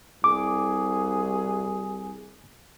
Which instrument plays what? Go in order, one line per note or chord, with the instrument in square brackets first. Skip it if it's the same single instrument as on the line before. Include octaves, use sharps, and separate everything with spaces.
[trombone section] C2 G#4 [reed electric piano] D6